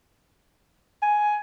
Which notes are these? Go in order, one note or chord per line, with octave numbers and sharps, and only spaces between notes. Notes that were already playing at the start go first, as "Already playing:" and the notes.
G#5